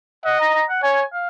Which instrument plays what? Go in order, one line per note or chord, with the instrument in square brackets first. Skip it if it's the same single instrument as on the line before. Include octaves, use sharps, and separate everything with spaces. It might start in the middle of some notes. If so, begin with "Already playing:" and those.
[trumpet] D#5 [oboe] F#5
[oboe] A#5
A#5
F#5
[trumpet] C#5 [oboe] G#5
[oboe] F5